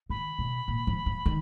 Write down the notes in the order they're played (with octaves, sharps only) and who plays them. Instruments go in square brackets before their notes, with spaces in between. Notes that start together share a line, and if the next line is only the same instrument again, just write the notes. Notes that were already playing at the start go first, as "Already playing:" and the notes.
[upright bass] D#3 [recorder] B5
[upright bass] B2
A#2
F3
F3
D#3